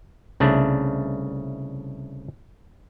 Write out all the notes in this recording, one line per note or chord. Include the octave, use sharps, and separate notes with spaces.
C2 C#3 A3 D4